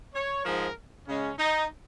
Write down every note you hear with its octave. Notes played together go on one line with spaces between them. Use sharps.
C#5
G#2 F3 G#3 A#4
C#3 G#3 C#4
D#4